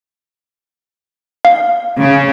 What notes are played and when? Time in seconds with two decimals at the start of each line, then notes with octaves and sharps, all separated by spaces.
1.45 F5
1.99 C#3